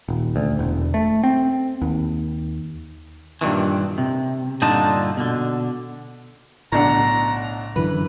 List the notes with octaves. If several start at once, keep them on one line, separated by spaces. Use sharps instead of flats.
D#1
D2
E1
A3
C4
D#2
G2 A#2 D#3 E3
C3
G2 A#2 D3 D#4 F4 A5
B2 D3
B1 A2 C#3 D4 F#5 A#5
F#2 D3 E3 B4